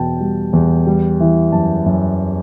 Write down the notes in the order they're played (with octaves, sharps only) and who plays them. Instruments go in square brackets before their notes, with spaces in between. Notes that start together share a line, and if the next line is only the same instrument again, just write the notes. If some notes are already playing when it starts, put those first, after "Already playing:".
Already playing: [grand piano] E2 B2 G5 A5
G3
E2
G3
E3
F#2 A5
F#2